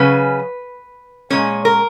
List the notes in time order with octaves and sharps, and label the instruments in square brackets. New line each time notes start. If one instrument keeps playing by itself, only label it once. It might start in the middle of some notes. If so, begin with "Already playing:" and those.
Already playing: [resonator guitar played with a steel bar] C#3 F#3 C#4 B4
A#2 F3 G#3 C#4 C#5
A#4